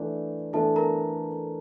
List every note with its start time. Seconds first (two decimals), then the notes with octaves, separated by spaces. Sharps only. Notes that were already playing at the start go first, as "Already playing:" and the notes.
Already playing: E3 A3 D4 D5
0.53 E3 A3 D4 A4 A5
0.76 A#4 A#5